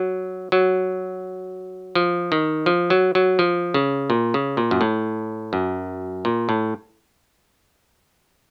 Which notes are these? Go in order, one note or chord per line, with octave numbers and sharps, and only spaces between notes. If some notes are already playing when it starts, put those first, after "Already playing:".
Already playing: F#3
F#3
F3
D#3
F3
F#3
F#3
F3
C#3
A#2
C#3
A#2
F#2
A2
F#2
A#2
A2